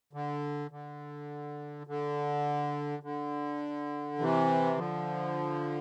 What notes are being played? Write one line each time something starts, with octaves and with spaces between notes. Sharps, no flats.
D3
D3
D3
D3
C3 E3
D3 F3